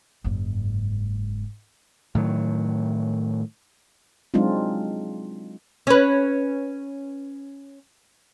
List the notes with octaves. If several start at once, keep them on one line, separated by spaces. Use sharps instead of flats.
F#1 G#2
A2 D#3 F#3
F#3 G#3 C4 D4 D#4 F4
C#4 B4